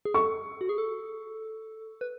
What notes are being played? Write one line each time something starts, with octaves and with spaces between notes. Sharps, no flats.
G#4
A4 C#6
F#4
G#4
A4
B4